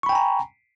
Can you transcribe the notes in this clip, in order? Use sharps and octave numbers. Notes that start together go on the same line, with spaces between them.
G5 G#5 A#5 B5 C#6